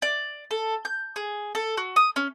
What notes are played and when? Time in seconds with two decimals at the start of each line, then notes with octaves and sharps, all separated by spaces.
0.02 D5
0.51 A4
0.85 G6
1.16 G#4
1.55 A4
1.77 F#4
1.96 D#6
2.16 C#4